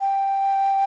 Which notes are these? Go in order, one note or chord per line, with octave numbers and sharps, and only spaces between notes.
G5